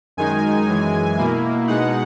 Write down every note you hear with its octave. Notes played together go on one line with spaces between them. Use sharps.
F#2 D#3 G#3 D#4 G#5
F#2 E3 G#3
B2 A#3 E4
B2 G#3 D#4 F#5